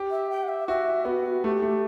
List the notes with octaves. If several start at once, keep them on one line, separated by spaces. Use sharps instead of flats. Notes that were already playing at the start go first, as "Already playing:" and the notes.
Already playing: G4
E5
G5
F#5
E5
F#4 E5
B3 F#4
A3 G4
A3